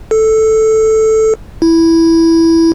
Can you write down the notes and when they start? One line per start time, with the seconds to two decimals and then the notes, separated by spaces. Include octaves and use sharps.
0.11 A4
1.62 E4